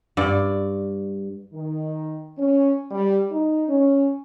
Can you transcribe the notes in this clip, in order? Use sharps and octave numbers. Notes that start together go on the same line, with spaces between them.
G2 D5
D#3
C#4
G3
D#4
C#4